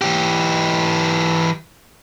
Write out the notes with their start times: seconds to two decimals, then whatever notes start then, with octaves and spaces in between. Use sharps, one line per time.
0.01 E3 G4